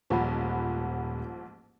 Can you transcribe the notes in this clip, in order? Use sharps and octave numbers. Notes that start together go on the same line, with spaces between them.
D#1 A1 G#2 F3 F#5 B5